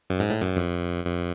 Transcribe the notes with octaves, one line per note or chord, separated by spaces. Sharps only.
F#2
G#2
A2
F#2
F2
F2